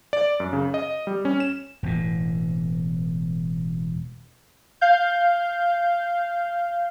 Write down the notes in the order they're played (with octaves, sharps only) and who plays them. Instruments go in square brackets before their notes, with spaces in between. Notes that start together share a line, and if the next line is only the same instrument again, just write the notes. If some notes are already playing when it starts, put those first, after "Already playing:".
[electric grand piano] D5
F#2
C#3
D#5
G3
C#4
E7
[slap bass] E1 A2
[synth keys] F5 G6